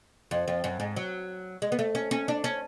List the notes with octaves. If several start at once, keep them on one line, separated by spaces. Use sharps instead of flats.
F2
F2
F#2
G#2
F#3
G#3
B3
A3
C#4
C#4
D4
C#4